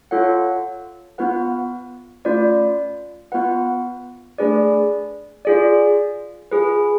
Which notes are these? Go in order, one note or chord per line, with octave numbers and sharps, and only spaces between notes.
F4 A4 C#5 F#5
B3 F4 B4 F#5
A3 C#4 F4 B4 D5
B3 F4 B4 F#5
A3 D4 G#4 B4 D5
F4 G#4 D5
F4 G#4 B4